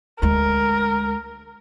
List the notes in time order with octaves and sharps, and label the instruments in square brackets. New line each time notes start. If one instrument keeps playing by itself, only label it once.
[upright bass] D2 G#3 [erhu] A#4